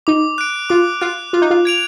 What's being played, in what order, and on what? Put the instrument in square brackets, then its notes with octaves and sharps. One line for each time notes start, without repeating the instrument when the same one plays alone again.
[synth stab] D#4 [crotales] D6
[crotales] F#6 D7
[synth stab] F4 [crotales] D6
[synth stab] F4 [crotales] F#6 D7
[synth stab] F4 [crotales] D6
[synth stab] D#4
F4
[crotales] G#6 D7 F7